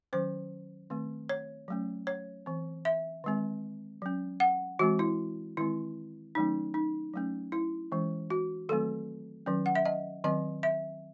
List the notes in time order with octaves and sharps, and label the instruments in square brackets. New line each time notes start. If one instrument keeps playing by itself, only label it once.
[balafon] D#3 F#3 C#4 C5
D#3 A3 C4
C#5
F#3 A3 C#4
C#5
E3 C4
E5
D#3 G#3 C4
F#3 C#4
F#5
E3 G#3 C4 F#4
E4
D#3 G#3 C4 E4
D#3 F#3 A3 C#4 D#4
D#4
F#3 A3 C#4
E4
E3 G#3 C#4
F#4
D#3 F#3 A3 C4 A4
D#3 F#3 C#4
F#5
E5
D#5
D#3 F#3 C4 D#5
E5